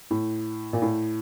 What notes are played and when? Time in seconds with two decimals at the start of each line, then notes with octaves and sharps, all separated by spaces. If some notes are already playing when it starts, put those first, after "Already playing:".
0.11 A2
0.73 A#2
0.82 A2